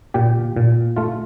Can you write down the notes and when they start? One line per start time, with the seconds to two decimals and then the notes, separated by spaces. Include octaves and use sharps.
0.14 A#2 G4
0.56 A#2
0.96 A3 F4